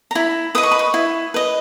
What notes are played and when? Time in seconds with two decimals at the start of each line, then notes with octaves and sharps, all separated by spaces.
0.11 A#5
0.15 E4 B5
0.55 B4 D#5 D#6
0.63 C#6
0.72 B5
0.79 C#6
0.94 E4
1.34 B4 D#5